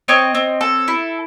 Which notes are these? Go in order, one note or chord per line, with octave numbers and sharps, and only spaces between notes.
C4 C#5 D#5
C4
A4
E4